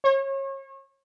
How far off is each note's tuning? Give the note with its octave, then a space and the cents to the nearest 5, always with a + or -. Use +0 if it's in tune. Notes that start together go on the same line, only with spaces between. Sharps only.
C#5 -35